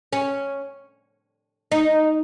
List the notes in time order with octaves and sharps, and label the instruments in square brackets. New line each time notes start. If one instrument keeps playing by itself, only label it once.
[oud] C#4
D#4